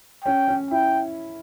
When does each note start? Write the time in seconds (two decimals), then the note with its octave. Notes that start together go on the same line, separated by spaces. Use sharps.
0.24 C#4 G5
0.48 C#4
0.71 E4 G5